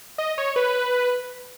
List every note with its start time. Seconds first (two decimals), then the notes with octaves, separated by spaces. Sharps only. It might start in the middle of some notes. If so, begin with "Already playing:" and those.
0.18 D#5
0.38 C#5
0.56 B4